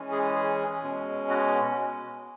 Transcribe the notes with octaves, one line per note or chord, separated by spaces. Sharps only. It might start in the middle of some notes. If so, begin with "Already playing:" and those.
Already playing: E3 G#3 C#4
G#4
G#4
B2 G#3 C#4
F#4